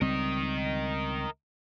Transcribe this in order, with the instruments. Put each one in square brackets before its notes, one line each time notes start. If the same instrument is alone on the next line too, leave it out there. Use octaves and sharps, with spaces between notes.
[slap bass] C#2 G3 C4 [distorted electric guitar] A#4 D#5